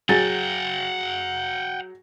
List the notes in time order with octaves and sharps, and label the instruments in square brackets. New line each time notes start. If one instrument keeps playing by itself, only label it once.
[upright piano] F#3 G#4 A6 [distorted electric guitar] F#5 G5